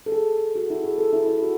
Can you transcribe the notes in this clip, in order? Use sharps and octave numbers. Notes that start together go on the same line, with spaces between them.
A4
G#4
F#4
E4
G#4
A4
E4
E4
F#4